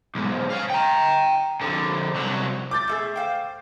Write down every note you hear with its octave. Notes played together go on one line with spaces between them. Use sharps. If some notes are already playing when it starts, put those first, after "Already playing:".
B1 G#2
C#5 F5
G5 A#5
F2 D3
C2 F#3
D6 G6 A6
B2 A3 G#4
C5 F5 G5